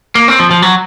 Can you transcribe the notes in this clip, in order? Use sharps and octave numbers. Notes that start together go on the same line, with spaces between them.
A#3
C4
F3
F3
F#3